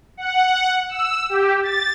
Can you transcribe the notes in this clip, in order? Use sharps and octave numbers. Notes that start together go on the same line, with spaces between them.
F#5
E6
G4
A6